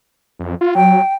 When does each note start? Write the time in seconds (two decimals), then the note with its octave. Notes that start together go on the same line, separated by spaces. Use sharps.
0.39 F2
0.61 F4
0.75 F#3 G5